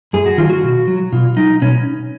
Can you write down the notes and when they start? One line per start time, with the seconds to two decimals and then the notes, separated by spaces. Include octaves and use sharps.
0.13 F#2 G#4
0.26 F#4
0.38 D#3 F#3 F4
0.50 F#4
0.63 B2
0.88 F#3
1.13 B2 F4
1.37 F#3 D#4
1.62 B2 C#4